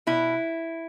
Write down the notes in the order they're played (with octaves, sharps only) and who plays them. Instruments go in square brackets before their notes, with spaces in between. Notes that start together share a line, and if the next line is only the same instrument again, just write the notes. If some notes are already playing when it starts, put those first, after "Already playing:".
[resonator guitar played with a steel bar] B2 E4